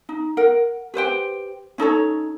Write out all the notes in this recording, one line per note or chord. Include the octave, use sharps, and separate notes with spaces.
D#4
A#4 F#5
G4 B4 C5 G5
C#4 D#4 A4 C#5